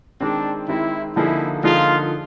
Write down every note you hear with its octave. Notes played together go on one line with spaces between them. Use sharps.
D#3 G#3 C4 D4
D#3 G#3 C4 E4
D3 F3 A#3 D#4 E4 G#4
D3 F3 A#3 D#4 F4 G#4